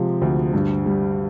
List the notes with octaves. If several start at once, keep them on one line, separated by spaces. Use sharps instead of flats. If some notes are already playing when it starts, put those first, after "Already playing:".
Already playing: C3 F3 G#3
D2
G2
G3